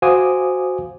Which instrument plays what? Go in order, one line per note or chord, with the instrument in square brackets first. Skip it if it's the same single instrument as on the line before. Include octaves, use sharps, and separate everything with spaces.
[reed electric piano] F#4 C5 F5 G#5 D6 D#6